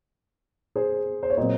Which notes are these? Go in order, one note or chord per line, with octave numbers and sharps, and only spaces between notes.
G#4 C5
C5
C#5
A#2 F#3 C4 C5 D#5